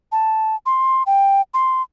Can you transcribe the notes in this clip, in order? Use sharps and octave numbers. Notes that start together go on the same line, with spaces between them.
A5
C6
G5
C6